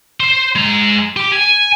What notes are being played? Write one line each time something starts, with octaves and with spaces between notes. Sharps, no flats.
C5
G#3 A#5
G4
G#5